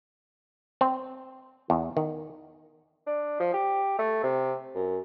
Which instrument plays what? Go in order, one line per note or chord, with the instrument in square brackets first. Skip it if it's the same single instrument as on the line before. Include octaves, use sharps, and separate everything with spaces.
[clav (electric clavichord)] C4
E2
D#3
[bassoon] D4
F3
G4
A3
C3
F#2